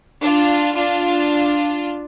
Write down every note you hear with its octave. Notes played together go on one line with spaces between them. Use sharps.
D4 F4
D4 F4